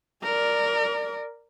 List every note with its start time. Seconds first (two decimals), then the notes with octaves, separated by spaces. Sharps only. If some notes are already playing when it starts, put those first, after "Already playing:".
0.24 A#4 D5